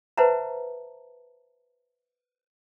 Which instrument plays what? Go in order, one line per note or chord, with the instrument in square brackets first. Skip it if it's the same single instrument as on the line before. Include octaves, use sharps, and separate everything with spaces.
[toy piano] B4 C5 E5 F#5 A5 A#5